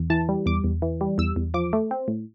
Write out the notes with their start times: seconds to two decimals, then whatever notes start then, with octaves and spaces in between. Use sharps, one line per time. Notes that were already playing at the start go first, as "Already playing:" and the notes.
Already playing: E2
0.10 E3 A5
0.29 G3
0.46 E2 D6
0.64 E2
0.82 E3
1.01 G3
1.18 E2 E6
1.36 E2
1.54 F3 D6
1.73 A3
1.91 C4
2.08 A2